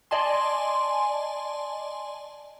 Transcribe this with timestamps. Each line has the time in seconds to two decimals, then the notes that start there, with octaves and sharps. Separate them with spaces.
0.11 D5 D#5 G#5 A5 C6